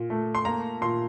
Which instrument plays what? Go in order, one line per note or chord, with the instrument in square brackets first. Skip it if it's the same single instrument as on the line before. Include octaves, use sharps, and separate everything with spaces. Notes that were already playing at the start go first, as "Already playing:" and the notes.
Already playing: [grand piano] A#2
A3
C6
A#3 A#5
A#2 C6